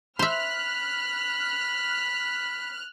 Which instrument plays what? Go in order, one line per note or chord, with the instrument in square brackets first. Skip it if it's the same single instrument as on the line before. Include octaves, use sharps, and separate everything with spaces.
[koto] C5 E5 [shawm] B5 [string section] F6 F#6